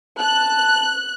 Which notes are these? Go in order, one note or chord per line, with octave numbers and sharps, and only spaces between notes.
A5 F#6